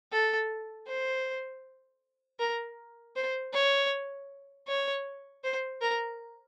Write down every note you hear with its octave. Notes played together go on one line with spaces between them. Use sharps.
A4
C5
A#4
C5
C#5
C#5
C5
A#4